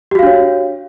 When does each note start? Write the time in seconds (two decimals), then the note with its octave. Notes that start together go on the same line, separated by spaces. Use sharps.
0.11 G4
0.15 F#4
0.19 F5
0.23 D4
0.27 C#5